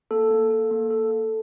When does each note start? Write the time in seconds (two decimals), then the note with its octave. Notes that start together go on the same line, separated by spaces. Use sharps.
0.11 A#3 A4
0.31 A#3
0.50 A4
0.71 A#3
0.90 A4
1.11 A4